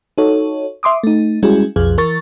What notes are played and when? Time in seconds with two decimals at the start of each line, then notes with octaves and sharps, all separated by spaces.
0.18 D#4 F#4 A4 C#5
0.83 E5 C6 D6 D#6
1.04 A3 D#4
1.43 G3 G#3 C#4 E4 F#4 G#4
1.76 B1 F2 F3 G#4
1.98 E3 A#4 C#6 A6